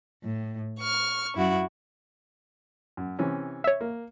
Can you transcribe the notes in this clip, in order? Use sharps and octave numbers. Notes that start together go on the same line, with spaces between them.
A2
C#6 F6
F#2 E4 F#4
F#2
C3 E3 C#4
C#5 E5
A#3